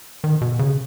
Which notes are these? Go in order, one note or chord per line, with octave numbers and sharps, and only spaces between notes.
D#3
B2
C#3